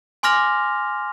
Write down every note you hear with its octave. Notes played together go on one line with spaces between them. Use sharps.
G#5 C6 D6 F6 A#6 F7